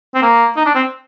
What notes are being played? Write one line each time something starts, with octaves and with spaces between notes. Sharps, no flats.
C4
A#3
D#4
D4
C4